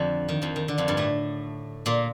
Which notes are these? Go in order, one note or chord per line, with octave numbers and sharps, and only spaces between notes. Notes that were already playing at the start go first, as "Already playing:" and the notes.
Already playing: F2 D3 F3
D#3
F2 F3
D#3
D3
F2 F3
G2 G3
A2 A3
A#2 A#3